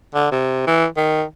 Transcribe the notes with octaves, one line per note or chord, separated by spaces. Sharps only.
D3
C3
E3
D#3